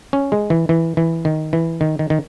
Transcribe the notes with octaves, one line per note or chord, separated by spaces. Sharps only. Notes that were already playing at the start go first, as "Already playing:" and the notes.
C#4
G#3
E3
E3
E3
D#3
E3
D#3
D#3
D#3